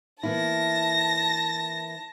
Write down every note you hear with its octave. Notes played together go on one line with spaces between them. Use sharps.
E3 A#3 E4 A5 A#6